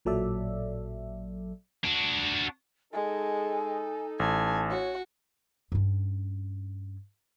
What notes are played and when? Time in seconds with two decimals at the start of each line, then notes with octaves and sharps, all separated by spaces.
0.05 A1 A#2 F#3 A4 D5 E5
1.84 D4 F#4
2.93 G#3 D#4 A4 G#5
4.20 A1 G#5 A5
4.70 F#4 C#5
5.72 G2 C#4